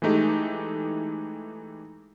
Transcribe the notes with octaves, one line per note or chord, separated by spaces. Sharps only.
E3 G#3 A3 D#4 G4